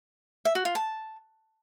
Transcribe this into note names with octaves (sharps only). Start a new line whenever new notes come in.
E5
F#4
F4
A5